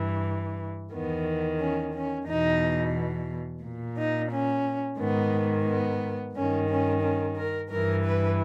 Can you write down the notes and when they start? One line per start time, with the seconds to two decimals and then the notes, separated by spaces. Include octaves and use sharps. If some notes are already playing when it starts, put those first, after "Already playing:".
Already playing: G2 E3
0.92 E2 D#3 B3
1.59 C#4
1.94 C#4
2.27 E2 B2 D#4
3.63 A#2
3.97 D#4
4.31 C#4
4.98 G#2 D#3 B3
5.67 B3
6.34 G2 D#3 C#4
6.69 C#4
7.02 C#4
7.36 A#4
7.70 G2 E3 A#4
8.04 B4